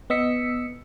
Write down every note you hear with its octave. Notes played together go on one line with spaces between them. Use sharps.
B3 D#5 E6 B6 C#7